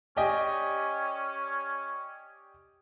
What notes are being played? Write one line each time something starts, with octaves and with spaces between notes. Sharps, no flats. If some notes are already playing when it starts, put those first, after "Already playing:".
C#4 G4 D5 D#5 G5 G#5